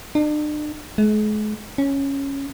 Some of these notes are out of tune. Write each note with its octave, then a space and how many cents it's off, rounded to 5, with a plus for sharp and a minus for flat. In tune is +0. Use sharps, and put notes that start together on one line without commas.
D4 +40
G#3 +40
C#4 -5